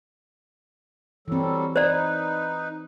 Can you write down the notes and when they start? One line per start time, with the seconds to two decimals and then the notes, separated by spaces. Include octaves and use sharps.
1.28 E3 F#3 G3 C4 A4
1.76 D#4 B4 C5 D5